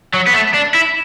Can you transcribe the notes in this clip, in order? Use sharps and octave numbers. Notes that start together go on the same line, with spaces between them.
F#3
B3
A3
D4
E4